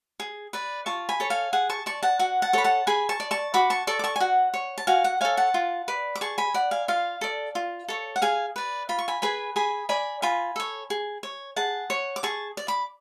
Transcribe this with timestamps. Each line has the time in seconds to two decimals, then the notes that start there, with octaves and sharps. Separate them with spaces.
0.20 G#4
0.53 B4 D5
0.86 F4 A5 C#6
1.09 G#5 B5
1.20 A4 C#5
1.30 F5 G#5
1.53 G#4 F#5
1.70 A5 C#6
1.86 D5 A5 C#6
2.03 F#5 A5
2.19 F#4 F#5
2.42 F#5 A5
2.53 A4 C#5 B5
2.64 F#5 A5
2.87 G#4 G#5 B5
3.09 A5 C#6
3.20 D5
3.31 A5 C#6
3.54 F#4 B5 D6
3.70 A5 C#6
3.87 A4 D5 A5 C#6
3.99 D6
4.04 A5 C#6
4.16 G#5
4.20 F#4 F#5
4.54 C#5
4.78 A5
4.87 F#4 F5 G#5
5.04 F#5
5.21 A4 C#5 F5 G#5
5.37 F#5 A5
5.54 F4
5.88 B4 D5
6.16 D6
6.21 G#4 A5 C#6
6.38 G#5 B5
6.54 D5 F#5
6.71 F5 G#5
6.88 F4 F5
7.21 A4 D5
7.55 F4
7.88 A4 C#5
8.16 F#5
8.22 G#4 F5 G#5
8.56 B4 D5
8.89 F4 B5
8.99 C#6
9.08 G#5 B5
9.22 G#4 B4 G#5 B5
9.56 G#4 G#5 B5
9.89 D5 G#5 B5
10.22 F4 G#5 B5
10.56 A4 C#5
10.90 G#4
11.23 C#5
11.56 G#4 F#5 A5
11.90 C#5
12.16 D6
12.23 G#4 A5 C#6
12.57 D5
12.68 B5 D6